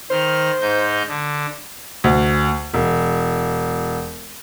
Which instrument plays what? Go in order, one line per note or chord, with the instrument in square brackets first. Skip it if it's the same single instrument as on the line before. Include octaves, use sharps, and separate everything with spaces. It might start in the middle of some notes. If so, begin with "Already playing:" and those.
[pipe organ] D#3 F6 [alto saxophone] C5
[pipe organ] G#2 D#4 G6
D3
[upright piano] D2
E1